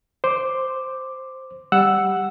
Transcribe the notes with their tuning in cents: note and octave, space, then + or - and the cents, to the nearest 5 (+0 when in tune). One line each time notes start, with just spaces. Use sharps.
C5 +0 D6 +5
G3 +0 F#5 +0 E6 +0